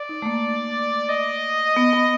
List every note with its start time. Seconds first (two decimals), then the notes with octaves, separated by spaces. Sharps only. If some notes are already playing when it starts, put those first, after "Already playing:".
Already playing: D5
0.09 D#4
0.22 A3
0.26 A#3
1.09 D#5
1.76 B3
1.93 B3